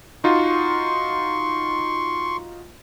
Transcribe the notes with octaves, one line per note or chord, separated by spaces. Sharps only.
D#4 F4 F#4 C6 C#6